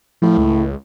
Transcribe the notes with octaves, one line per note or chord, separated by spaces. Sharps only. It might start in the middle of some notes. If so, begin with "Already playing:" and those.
A2 F3
C#2